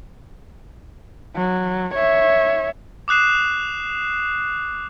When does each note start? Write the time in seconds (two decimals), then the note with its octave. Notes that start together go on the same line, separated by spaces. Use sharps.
1.36 F#3
1.94 C#5 E5
3.08 D6 D#6 F#6 C7 E7